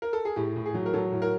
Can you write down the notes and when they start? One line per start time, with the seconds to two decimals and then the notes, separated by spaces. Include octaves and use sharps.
0.02 A#4
0.13 A4
0.25 G#4
0.36 A2 G4
0.56 A2
0.66 G#4
0.74 F#3
0.86 A#4
0.93 F#3 A4
1.12 A2
1.22 A#4